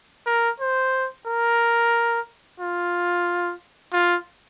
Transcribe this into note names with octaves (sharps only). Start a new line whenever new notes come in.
A#4
C5
A#4
F4
F4